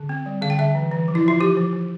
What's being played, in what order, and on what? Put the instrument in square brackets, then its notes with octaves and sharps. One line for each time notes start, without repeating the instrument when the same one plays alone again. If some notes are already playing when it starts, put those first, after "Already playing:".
Already playing: [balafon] D3
C4
G3
D3 F5
G5
D3 E5
E3
E3
F3
E4
F3 F4
F3 G4
F3
F3